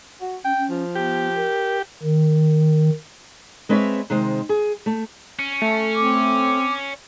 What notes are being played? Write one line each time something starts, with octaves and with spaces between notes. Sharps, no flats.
F#4
C#4 G5
C#4
F3
B3 G4
A#4
D#3
G#3 C4 B4 C#5 D5 E5
C3 D#3 G#3 C5
G#4
A3
C#4
A3
C4 D6